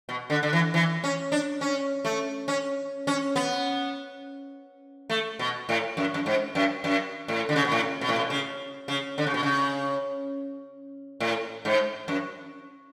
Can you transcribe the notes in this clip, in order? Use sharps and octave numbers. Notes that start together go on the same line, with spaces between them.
B2
D3
D3
E3
E3
C#4
D4
C#4
A3
C#4
C#4
B3
A3
B2
A2
F#2
F#2
G#2
F#2
F#2
A2
D3
C#3
B2
A2
B2
A2
B2
C#3
C#3
D3
C#3
B2
C#3
A2
G#2
F#2